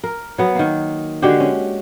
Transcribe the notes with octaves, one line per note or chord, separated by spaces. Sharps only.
A#4
F#3 B3
D#3 A#3
D3 G#3 F#4 G4
C#4